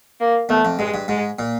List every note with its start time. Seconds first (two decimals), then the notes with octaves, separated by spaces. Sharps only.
0.21 A#3
0.49 E2 A3
0.65 F2
0.79 G2 G#3
0.94 G2
1.08 G#2 G#3
1.39 A#2